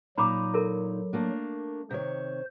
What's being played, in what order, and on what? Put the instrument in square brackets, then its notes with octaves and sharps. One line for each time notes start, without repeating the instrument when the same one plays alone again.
[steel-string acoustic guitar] A#2 D#4 [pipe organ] F#3 [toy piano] A#5 B5 D6
[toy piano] E4 A4 A#4
[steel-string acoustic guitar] A3 A#3 D4
[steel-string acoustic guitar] C3 D#3 C#5 [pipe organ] C5